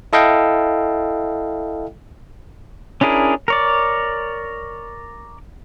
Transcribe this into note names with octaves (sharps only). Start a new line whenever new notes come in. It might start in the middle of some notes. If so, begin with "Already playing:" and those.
E4 A4 D#5 F5 G5
C#4 D4 E4 G#4 A#4
A#4 C#5 D5